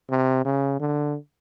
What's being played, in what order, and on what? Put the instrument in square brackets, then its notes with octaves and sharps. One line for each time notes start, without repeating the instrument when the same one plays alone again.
[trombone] C3
C#3
D3